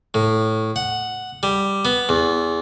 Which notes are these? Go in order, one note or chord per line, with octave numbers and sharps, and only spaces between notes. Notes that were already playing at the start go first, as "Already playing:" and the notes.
A2
F#5
G3
B3
E2